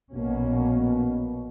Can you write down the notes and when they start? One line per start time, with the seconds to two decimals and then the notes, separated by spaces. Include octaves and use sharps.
0.13 A#1 B2 A#3 C#4